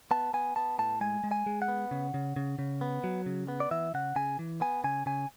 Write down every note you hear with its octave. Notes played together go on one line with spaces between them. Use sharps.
B3 A5
B3 G#5
B3 A5
A2 A5
G#3 G#5
G#3
G#5
G#3
F#5
B3
C#3
C#3
C#3
C#3
B3
F#3
C#3
B3
D5
E3 E5
C#3 F#5
C#3 G#5
E3
B3 G#5
C#3 G#5
C#3 G#5